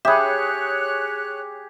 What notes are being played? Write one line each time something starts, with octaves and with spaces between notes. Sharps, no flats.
G4 G#4 C#5 E5 B5 F#6